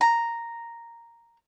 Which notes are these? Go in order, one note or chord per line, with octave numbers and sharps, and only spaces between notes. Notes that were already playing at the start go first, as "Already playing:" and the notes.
A#5